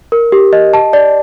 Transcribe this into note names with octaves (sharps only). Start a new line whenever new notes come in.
A#4
G4
D#5
A5
D5